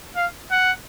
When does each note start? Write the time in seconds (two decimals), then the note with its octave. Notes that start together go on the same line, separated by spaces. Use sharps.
0.16 F5
0.51 F#5